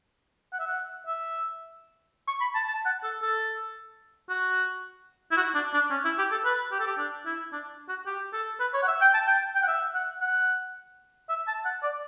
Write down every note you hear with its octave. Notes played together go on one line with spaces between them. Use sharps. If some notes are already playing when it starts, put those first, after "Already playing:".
F#5
E5
F#5
E5
C#6
B5
A5
A5
F#5
A4
A4
F#4
E4
F#4
D4
D4
C#4
E4
G4
A4
B4
G4
A4
G4
D4
E4
D4
F#4
G4
A4
B4
C#5
F#5
E5
G5
A5
G5
G5
F#5
E5
F#5
F#5
E5
A5
F#5
D5